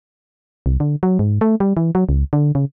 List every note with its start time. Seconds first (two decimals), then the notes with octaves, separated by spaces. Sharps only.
0.66 C2
0.80 D3
1.03 F#3
1.19 G#2
1.41 A3
1.60 G3
1.77 E3
1.95 F#3
2.09 C#2
2.33 D3
2.55 C#3